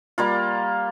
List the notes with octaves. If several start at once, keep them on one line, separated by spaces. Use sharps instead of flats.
G3 A#3 F4